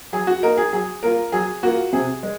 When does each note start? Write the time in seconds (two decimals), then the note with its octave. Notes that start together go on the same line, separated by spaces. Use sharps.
0.13 F#3 G#4
0.27 F#4
0.43 A#3 D#4 A#4
0.57 G#4
0.73 F#3 G#4
1.03 A#3 F4 A#4
1.32 F#3 G#4
1.63 A#3 F4 F#4
1.93 C3 G#4
2.23 G#3